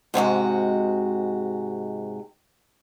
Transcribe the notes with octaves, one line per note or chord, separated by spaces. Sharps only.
G#2 C3 G#3 F#4